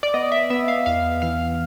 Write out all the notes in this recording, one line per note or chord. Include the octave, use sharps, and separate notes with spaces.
D5
B3 D#5
E5
B3 E5
F5
E2 F5
E3 F5